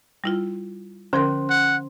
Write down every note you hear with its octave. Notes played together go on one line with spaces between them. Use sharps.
G3 E4 F4
D3 F3 C#4 A#4 C5 C6
F#5